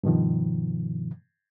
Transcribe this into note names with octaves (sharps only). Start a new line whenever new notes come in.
G2 B2 D#3 F3